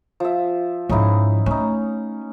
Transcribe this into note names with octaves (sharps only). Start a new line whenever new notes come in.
F3 E5
G#2 F3 C#4 D#4 E4
A3 C#4 D#4